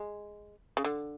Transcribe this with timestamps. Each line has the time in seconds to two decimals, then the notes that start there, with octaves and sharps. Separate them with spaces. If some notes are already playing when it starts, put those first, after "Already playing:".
Already playing: G#3
0.77 C#3
0.84 D3